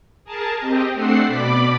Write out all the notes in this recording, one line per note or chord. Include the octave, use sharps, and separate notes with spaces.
G#4 A#4 A5
C4 G4 D#5
A3 C4 D4 A4 F#5 C7
B2 D5 B5 D6